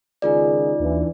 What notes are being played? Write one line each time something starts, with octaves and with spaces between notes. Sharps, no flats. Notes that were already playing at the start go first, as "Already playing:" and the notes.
C#2 D#3 D#4 F4 G#4 D5
D#2 E3 D4